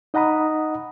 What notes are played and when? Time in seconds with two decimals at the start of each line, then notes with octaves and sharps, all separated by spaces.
0.14 D#4 D#5 F#5 A#5 B5 D#6